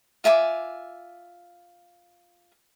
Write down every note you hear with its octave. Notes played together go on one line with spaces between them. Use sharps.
F4 E5 G#5 D6